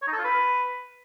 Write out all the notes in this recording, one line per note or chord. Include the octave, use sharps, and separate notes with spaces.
C#5
D#4
A4
F4
B4